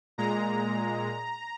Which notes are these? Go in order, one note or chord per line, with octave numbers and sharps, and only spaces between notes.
A#2 G#3 A#5